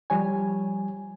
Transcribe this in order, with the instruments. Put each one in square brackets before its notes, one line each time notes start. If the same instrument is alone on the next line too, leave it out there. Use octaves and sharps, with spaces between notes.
[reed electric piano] F3 G3 C#5 G#5